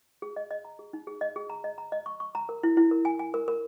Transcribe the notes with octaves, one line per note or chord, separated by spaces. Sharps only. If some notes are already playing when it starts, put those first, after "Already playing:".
G#4
D#5
D#5
A#5
G#4
D#4
G#4
D#5
G#4
A#5
D#5
A#5
D#5
C#6
C#6
A#5
A#4
E4
E4
A#4
G#5
G#5
A#4
A#4